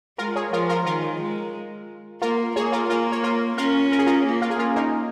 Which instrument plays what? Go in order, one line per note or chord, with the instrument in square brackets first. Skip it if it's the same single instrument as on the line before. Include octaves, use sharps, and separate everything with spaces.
[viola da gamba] G#3 [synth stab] F4 A#4
[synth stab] G#4 C#5
[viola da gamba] F3 [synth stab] F4 A#4
[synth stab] F4 A#4
[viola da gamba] D#3 [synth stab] F4 A#4
[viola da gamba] G#3
[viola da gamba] A#3 [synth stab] F4 A#4
[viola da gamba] A#3 [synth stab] G#4 C#5
[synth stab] F4 A#4
[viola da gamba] A#3 [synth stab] F4 A#4
[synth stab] C#5
F4 A#4
[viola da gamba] C#4 [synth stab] F4 A#4
[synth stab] A#4
G#4
F4 A#4
[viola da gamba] A#3
[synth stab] F4 A#4
G#4
C#4 F4
A#3 D#4